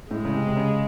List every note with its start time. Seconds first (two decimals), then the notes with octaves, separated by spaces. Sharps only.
0.11 A2 G#3
0.25 C#3
0.34 C3
0.47 C3
0.57 C#3